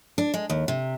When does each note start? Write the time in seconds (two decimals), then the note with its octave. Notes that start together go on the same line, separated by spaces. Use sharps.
0.18 D4
0.34 G#3
0.50 D#2
0.68 C3